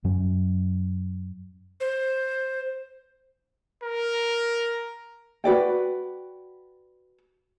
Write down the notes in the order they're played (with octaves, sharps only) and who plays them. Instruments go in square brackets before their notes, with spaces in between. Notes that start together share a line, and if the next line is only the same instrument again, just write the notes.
[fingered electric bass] F#2 F#3 C#4
[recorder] C5
[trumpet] A#4
[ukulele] F#4 B4 D5 G5